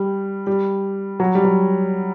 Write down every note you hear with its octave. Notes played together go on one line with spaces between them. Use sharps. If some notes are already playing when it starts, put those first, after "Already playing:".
Already playing: G3
G3
F#3
G3
F#3